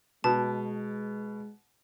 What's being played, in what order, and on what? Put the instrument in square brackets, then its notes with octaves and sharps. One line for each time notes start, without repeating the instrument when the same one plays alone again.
[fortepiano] B2 [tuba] G#3 [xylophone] A5